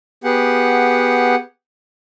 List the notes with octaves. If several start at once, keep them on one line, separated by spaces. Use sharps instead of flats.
B3 G4 G#4 F#5